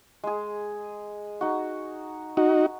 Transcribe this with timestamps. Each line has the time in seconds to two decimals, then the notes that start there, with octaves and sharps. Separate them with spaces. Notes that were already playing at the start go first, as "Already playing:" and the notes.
0.24 G#3 G#4
1.41 D#4 F#4
2.37 D#4 F#4